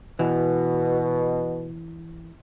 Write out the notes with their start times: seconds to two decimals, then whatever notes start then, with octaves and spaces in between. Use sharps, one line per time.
0.19 B2 E3